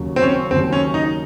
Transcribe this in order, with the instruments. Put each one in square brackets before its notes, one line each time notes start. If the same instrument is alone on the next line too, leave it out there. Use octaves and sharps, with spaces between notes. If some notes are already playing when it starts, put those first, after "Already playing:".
Already playing: [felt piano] D#2 C#3 F#3
[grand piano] C4
C#4
[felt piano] D#2 C#3 F#3 [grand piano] C4
[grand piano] C#4
D#4